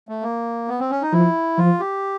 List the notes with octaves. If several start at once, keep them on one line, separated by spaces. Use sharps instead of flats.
A3
A#3
B3
C4
C#4
D#4
F3 E4
F3 F4
G4